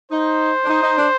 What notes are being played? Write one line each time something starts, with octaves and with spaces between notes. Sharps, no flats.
D#4 C5
D4
D#4
D#4
D4